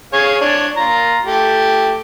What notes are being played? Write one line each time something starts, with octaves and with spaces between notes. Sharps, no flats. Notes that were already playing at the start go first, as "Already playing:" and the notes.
G#4 C#5 F5
D4 C#5
F4 A#5
A3 G4